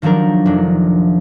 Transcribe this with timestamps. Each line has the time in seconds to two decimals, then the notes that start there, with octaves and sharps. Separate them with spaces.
0.02 D#3 F3 F#3 D4 A#4
0.46 F1 D4